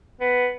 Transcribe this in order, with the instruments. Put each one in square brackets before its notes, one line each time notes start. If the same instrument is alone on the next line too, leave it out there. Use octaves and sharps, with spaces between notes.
[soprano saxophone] B3